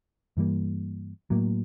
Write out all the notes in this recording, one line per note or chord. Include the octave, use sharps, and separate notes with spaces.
G2 E3 G3 A#3
A2 F#3 A#3